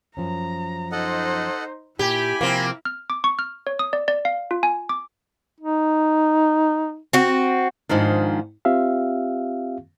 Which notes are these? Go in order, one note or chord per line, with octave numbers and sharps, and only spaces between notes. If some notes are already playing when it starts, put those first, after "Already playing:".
F#2 F3 C#4 A#5
D#4 A4 C5 D#5 F#5
A#2 E4 G4 G#5 B5
C3 F3 A#3 C4
F6
D6
C#6
F6
C#5
D#6
D5
D5
F5
F4
G#5
D6
D#4
C4 F#4
G#2 D#3 F3 D4
C4 F4 G4 E5 F5